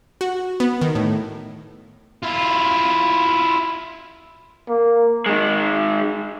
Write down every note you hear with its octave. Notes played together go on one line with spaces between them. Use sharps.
F#4
B3
D#3
A2
E4 F4
A#3
D#3 G#3